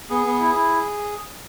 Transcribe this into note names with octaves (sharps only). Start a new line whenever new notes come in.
B3 G#4
B3
E4
E4